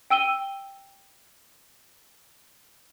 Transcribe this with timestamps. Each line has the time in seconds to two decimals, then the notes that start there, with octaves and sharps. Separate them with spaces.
0.10 G5 E6 D#7 G7